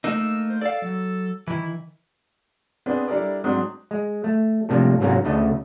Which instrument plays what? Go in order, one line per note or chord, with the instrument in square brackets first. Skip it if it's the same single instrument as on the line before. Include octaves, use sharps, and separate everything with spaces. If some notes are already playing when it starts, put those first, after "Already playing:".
[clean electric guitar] A3 A#3 D#4 [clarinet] E6
[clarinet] C5
[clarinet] A4 [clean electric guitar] D5 F5
[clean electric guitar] F#3
[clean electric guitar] D#3 E3 [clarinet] E4
[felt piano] B3 C4 D4 G#4 B4
G3 D4 E4 A4 A#4 D5
G#2 F#3 C4 D4 D#6 F#6
[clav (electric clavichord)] G#3
A3
A2 C3 F3 G3 A#3 D4
G#2 C3 F#3 A#3 C#4 A#5
D2 C#3 A3 A4 D#5